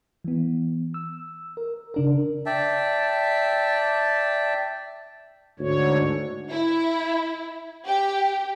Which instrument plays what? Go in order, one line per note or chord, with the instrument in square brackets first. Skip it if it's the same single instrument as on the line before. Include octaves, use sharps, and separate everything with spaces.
[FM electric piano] E3 B3
E6
A#4
C#3 D4 A#4
[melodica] D5 E5 G5 A5
[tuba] D2 [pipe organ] G#2 D3 C#5
[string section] E4
G4